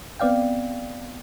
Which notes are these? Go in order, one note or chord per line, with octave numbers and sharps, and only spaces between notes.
B3 C4 D5 F5 G5